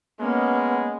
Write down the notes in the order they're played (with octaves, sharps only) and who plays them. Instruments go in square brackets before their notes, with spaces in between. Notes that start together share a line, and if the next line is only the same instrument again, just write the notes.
[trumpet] G#3 [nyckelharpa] A#3 C#4 [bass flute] B3